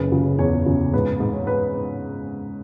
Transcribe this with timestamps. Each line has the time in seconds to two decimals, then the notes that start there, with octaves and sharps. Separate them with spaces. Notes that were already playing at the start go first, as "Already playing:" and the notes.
Already playing: F#1 C#3 B4
0.12 C#3
0.39 E2 C#5
0.66 C#3
0.94 G#2 B4
1.20 G#2
1.33 C#5
1.47 B4